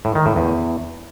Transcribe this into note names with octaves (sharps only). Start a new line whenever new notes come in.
A2
D#3
A2
E2